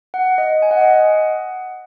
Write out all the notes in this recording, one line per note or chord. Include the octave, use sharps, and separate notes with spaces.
F#5
D#5
G#5
F#5
D#5
F#5